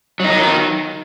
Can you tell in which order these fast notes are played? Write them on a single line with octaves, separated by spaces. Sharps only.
F#3 D#4 D#3